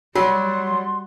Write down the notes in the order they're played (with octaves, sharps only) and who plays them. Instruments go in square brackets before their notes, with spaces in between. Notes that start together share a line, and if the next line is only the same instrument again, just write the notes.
[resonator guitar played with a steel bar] F#3 [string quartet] G3 [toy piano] F4 [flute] C6